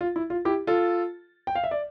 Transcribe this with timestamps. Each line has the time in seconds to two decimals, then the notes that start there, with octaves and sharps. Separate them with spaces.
0.01 F4
0.16 E4
0.30 F4
0.45 E4 G4
0.67 F4 A4
1.47 G5
1.55 F5
1.64 E5
1.71 D5